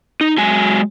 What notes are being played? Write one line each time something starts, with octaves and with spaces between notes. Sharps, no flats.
D#4
F#3 G#3 G#5